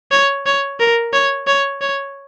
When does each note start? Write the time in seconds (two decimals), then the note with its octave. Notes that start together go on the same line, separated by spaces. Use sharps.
0.11 C#5
0.46 C#5
0.80 A#4
1.13 C#5
1.47 C#5
1.81 C#5